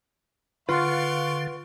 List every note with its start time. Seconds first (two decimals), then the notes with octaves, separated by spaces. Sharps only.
0.69 D3 F4 B4 F5 F#5 C6 C#6